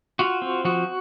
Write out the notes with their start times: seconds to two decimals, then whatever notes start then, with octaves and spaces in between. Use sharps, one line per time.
0.19 F4 F#4
0.42 C4
0.65 F3 F#4